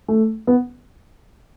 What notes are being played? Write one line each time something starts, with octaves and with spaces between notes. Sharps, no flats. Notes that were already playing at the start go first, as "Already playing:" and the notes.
A3
B3